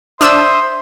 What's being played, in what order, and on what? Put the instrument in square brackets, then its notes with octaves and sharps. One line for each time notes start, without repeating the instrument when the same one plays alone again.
[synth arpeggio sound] D4 E6 [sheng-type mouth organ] C5 E5 D#6 [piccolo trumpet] C6